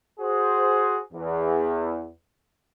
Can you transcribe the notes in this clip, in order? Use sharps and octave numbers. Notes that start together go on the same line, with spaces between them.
F#4 G#4 C5
E2